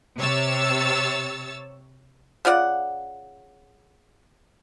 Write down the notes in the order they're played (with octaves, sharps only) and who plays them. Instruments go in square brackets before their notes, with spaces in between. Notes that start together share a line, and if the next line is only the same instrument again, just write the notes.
[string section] C3 C#5 E6 A6
[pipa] C#3 F4 D5 F#5